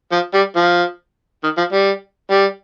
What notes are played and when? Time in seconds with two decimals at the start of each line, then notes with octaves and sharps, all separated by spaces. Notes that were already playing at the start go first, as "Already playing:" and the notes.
0.12 F3
0.34 G3
0.56 F3
1.43 D#3
1.57 F3
1.72 G3
2.31 G3